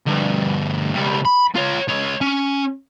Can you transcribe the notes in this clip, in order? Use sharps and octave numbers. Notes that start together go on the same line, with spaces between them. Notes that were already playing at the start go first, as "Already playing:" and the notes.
D2 G2
C#2 G3
B5
F4 C#5
C#2 C#5
C#4